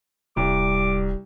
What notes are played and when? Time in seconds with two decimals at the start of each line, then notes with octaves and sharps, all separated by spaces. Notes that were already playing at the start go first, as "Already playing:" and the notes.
0.37 D1 C2 G3 D6